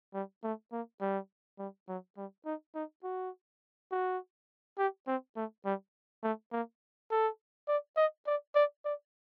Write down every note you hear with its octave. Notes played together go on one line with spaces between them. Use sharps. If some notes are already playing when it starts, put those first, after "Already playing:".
G3
A3
A#3
G3
G3
F#3
G3
D#4
D#4
F#4
F#4
G4
C4
A3
G3
A3
A#3
A4
D5
D#5
D5
D5
D5